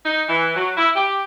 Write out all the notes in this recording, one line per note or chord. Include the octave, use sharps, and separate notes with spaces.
D#4
E3
F#3
E4
G4